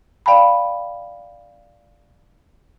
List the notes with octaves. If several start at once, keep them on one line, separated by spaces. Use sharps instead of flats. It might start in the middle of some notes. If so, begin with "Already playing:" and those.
D5 F5 G5 A5 B5